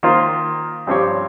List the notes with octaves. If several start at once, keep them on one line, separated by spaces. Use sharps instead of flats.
D#3 A#3 F4 C5
G2 F3 C4 G4 C#5